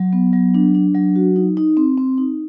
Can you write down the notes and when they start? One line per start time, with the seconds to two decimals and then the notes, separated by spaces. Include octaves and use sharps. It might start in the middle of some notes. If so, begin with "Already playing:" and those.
Already playing: F#3
0.13 B3
0.33 F#3
0.54 D4
0.75 D4
0.95 F#3
1.16 F#4
1.36 D#4
1.57 D#4
1.77 C4
1.98 C4
2.18 D#4